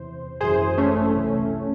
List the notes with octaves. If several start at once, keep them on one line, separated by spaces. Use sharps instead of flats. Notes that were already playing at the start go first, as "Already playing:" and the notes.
Already playing: E2 C3 E3 C5
G#1 F#2 E3 G#4 C5
A3 C#4
C2 C3 E3